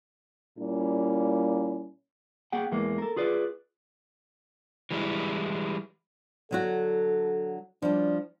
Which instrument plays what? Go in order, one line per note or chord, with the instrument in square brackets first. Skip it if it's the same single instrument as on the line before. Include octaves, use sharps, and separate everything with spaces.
[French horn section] A#2 G3 A#3 C#4 E4
[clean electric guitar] A#3 G#4 F#5 G5
E2 E3 G#3 A#3
A4 A#4
F4 G#4 B4 D5
[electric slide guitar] E3 G3 G#3 E4
[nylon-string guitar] D3 F#3 F#4 [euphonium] A4
[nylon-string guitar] F3 G3 [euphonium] D4